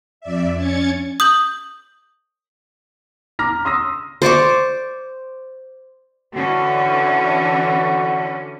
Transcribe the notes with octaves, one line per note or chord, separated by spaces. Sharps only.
F2 D5 E5
C#4 G#6 A6 C#7
D#6 G6 F#7
A#5 D6 F6 A#6
C6 D#6 E6 A#6
C5 D5 C#6 D6
D3 E3 C#4 F#4